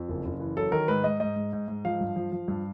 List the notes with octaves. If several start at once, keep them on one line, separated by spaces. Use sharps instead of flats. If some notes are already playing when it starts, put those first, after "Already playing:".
Already playing: F2
F#1
F#1
E3
F#3 A4
D#3 A#4
G#2 B4
G#2 D#5
G#2 D#5
G#2
G#2
G#2
F3 F5
G2
F3
F3
G2